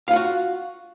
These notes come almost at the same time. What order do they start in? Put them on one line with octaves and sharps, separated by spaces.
F5 F4 F#5 F#4